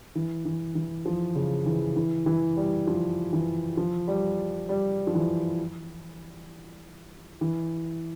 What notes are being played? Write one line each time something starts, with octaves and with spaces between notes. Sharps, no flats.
E3
E3
E3
F3
C#3
E3
E3
E3
G3
F3
E3
F3
G3
G3
F3
E3
E3